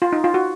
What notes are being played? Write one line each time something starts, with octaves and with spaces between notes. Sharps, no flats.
F4
D#4
F4
F#4